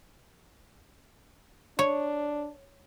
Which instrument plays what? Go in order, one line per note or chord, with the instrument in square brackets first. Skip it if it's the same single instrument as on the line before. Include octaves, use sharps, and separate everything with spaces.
[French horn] D4 [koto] C#5